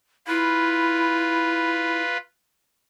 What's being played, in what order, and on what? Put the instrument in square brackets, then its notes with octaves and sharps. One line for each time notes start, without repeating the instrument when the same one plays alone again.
[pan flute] E4 [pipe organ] F4 B4